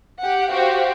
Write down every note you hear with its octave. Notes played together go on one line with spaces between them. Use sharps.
G4 F#5
F#4 G4 C5 F5